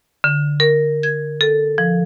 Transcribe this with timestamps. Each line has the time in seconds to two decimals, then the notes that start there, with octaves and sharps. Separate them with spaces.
0.24 D3
0.60 A#4
1.03 G#6
1.41 A4
1.78 F3